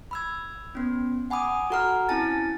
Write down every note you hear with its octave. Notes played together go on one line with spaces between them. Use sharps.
B5 E6 G#6
B3 C#4
F#5 G#5 B5 D6 D#6
F#4 A4 F#5 A#5 F6
C4 C#4 E4 G#5 A5 A6